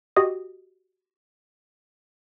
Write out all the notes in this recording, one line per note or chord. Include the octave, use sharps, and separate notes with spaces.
F#4 G4 D#5 D#6